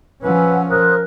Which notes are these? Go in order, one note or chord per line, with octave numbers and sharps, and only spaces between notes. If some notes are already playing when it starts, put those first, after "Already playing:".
F3 C#4 B4 F#5 G#5 E6
A#4 C5 D#6 F#6